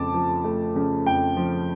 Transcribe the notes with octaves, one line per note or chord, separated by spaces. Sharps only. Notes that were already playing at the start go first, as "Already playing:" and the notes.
Already playing: F2 C#3 A3 A5 D6
F3
A3
C#3
F2 G5
F3